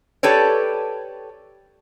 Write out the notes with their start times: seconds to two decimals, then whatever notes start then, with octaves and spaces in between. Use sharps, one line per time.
0.23 G4 A4 B4 C#5 D5